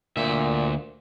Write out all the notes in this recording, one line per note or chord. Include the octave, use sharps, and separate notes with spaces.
D2 A#2 E5